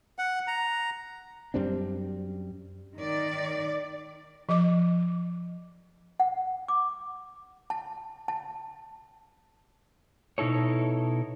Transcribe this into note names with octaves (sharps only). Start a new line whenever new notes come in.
F#5
A#5
F#2 G3 C4 D4
D#3 D5
F3 D#5 D6
F#5
D6
A5
A5
B2 D#4 E4 A4 C#5